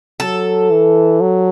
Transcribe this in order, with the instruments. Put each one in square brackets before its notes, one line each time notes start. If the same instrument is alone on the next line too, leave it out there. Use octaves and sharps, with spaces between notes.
[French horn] F#3 [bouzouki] A4
[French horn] E3
F#3